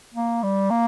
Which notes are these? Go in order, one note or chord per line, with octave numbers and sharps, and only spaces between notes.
A#3
G3
A#3